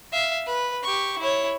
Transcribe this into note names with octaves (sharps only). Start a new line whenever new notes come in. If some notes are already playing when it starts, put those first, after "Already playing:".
E5 F5
B4
G4 C#6
E4 C#5